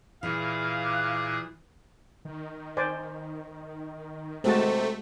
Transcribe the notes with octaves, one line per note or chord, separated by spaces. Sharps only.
A#2 E3 G#4 F5
D6 F#6
D#3
C5 D5 G#5
C3 G#3 A3 F#4 A5